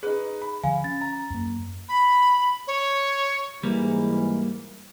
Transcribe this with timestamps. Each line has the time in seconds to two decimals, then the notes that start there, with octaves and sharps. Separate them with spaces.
0.03 D#4 G#4 B4
0.42 B5
0.64 D3 F3 F5 G#5
0.84 C#4 A6
1.01 A#5
1.30 F#2 A#3
1.88 B5
2.67 C#5
3.63 G#2 E3 G3 A#3